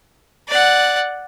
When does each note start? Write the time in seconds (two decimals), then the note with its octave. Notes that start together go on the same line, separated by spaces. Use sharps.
0.48 D5 F#5